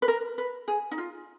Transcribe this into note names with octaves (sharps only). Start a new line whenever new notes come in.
B4
A#4
B4
G#4
D#4
F4